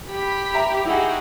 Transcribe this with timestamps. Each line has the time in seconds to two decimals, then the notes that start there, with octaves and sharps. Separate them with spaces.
0.10 G4 B5 B6
0.54 E5 A#5
0.85 D#4 E4 F#4 G#4